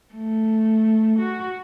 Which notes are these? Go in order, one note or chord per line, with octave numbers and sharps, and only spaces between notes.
A3
F#4